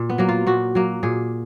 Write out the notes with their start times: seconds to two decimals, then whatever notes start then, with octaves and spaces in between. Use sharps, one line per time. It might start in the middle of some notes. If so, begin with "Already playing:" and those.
Already playing: A#2
0.09 B3
0.18 F#3 A#3
0.29 F4
0.47 A#2 F#4
0.75 F#3 A#3
1.03 A#2 G#4